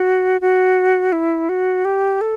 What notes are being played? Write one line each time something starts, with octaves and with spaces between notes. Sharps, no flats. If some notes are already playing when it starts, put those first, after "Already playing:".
Already playing: F#4
F#4
E4
F#4
G4
A4